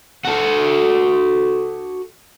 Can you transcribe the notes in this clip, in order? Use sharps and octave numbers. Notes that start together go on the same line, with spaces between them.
F#4 A4